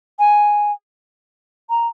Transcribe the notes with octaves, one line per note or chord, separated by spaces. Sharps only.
G#5
A#5